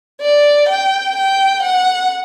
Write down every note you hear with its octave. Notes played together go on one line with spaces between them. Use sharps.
D5
G5
G5
F#5